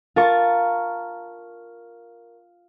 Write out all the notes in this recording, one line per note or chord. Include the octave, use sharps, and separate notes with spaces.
F4 A#4 A5 C#6